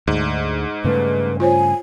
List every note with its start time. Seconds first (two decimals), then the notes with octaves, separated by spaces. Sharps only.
0.08 D2 G#2
0.84 G2 C#3 A3 B4
1.40 F4 C5 C#5 G#5